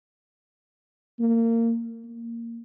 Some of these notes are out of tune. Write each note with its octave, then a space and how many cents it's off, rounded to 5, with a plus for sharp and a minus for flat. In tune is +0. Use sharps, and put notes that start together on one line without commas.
A#3 -25
A#3 -10